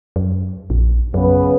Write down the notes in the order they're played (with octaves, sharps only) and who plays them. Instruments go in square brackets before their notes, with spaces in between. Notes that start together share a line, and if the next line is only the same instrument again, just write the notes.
[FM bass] F#2
A#1
[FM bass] F#2 [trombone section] C#3 B3 B4